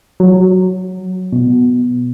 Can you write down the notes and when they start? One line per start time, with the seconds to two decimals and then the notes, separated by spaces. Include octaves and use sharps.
0.20 F#3
1.32 B2